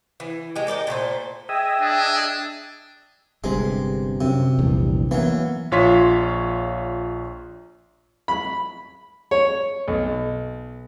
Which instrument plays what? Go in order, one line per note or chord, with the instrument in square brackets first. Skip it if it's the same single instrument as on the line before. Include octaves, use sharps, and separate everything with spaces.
[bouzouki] E3
G#3 G4
A#4 D5 D#5 G5
A#2 A3 F#4 C5
[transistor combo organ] G#4 D#5 E5 [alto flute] G5
[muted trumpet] D4
[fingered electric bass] G1 G2 C3 [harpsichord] G#3
[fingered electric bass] F#2 [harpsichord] C3
[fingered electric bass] A#1 E2 G2
[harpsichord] E3 F#3 [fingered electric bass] A#3 B3
[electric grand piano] A#1 F4 C#5 C6 B6
[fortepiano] B5
C#5
B1